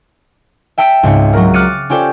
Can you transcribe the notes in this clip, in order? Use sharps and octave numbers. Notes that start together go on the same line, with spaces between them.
E5 G5 A5 E6 B6 D7
C#2 G#2 C4 C#7
F#3 F#4 A#4
D6 F6 F#6 A6 C#7 D#7
C#4 F4 G4 A4 C5 D5